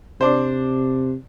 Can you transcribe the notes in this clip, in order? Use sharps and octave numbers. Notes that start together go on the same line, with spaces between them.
C3 D4 C5